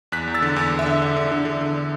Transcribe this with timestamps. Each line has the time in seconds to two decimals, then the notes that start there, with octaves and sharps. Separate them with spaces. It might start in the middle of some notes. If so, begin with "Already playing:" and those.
0.12 E2 F#6 B6
0.27 E2
0.34 E6 A6
0.42 D3
0.56 E2
0.72 E2
0.79 E5
0.86 D3
1.02 D3
1.16 D3
1.32 D3
1.45 D3
1.61 D3